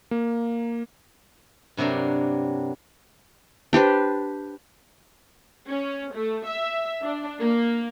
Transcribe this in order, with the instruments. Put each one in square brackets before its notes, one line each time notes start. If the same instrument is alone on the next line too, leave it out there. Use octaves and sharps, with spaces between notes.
[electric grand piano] A#3
[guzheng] G2 C3 F#3 A#3 D4
[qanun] D4 G4 B4 C5
[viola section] C#4
A3
E5
D4
A#3